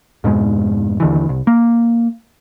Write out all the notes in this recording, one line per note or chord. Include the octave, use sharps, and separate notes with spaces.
F2 G#2 B2 G#3
D#2 D3 E3
C2
A#3